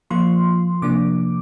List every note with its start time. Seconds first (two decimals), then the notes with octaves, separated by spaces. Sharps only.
0.10 F3 A#3 F4 C6
0.82 C3 F3 A#3 D4 D6